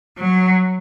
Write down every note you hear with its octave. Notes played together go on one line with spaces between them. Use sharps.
F#3